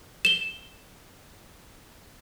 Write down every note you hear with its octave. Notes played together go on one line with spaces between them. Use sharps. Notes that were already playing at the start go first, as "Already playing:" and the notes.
E7 G7